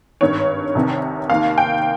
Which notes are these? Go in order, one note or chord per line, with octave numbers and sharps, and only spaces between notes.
G#1 G2 D#3 C#5
C2 C3 D#3
D#2 D#3 F5
G5